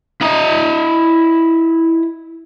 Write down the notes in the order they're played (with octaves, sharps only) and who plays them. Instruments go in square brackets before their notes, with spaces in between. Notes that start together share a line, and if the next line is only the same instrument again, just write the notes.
[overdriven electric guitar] E4 D#5